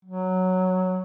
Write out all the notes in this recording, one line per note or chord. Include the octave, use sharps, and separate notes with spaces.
F#3